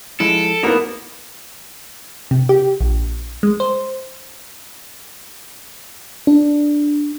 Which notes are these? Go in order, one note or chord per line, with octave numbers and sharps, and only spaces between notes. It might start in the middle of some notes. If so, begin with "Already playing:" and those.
F3 G#3 E4 A4 D7 E7
A#3 B3 D#4 E4 F#4
C3
G4
A#1
G#3
C5
D4